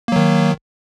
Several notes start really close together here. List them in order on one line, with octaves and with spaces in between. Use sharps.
A#3 F#3 D#3